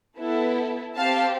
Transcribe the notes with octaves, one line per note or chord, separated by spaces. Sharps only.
B3 E4 A4
C4 G4 F5 A5